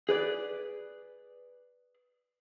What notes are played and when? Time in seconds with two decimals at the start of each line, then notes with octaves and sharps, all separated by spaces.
0.09 G#4 B4 D5